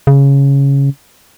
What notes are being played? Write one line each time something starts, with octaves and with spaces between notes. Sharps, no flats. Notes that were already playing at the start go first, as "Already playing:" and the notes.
C#3